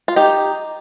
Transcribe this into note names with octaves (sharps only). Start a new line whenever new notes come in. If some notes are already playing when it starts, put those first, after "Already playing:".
F4
D#4 G4